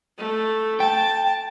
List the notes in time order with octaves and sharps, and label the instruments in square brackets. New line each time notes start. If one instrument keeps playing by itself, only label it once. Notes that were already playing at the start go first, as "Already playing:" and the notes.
[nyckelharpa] A3
[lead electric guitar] G5 [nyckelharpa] A5